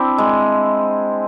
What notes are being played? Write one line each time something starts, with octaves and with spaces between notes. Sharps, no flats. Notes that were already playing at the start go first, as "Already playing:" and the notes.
Already playing: C4 D4 E4
G#3